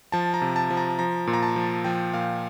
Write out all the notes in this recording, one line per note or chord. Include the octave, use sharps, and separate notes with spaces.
F3 A5
A#5
C3
A5
F3
A#5
F3 A#5
A#2
A#5
A5
F3
F3 G5
A#2 F5